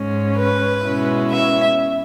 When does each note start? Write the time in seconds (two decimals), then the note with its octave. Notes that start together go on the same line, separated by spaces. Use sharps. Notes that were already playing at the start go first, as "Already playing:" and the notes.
Already playing: G#2 G#3 C#4
0.37 B4
0.84 B2 G#3 C#4 E4
1.31 E5